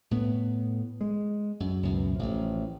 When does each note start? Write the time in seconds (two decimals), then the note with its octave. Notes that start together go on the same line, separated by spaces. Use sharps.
0.11 A2 B3
1.01 G#3
1.60 F#2
1.83 C#2 F#2 B2
2.16 A1 F3